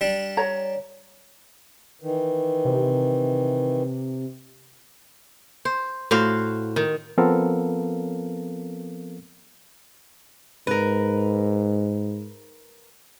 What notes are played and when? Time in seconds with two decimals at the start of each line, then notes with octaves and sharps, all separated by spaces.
0.01 G3 D4
0.37 C#5 A#5
2.02 D#3 E3
2.65 C3
5.65 C5
6.11 A2 F#4 C5 F5
6.76 D#3
7.18 F3 B3 C4 A4 A#4 F5
10.67 G#2 A#4 B4